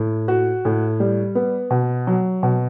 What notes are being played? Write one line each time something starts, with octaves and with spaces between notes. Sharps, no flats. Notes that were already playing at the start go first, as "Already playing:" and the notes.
Already playing: A2
F#4
A2
G3
B3
B2
F#3
B2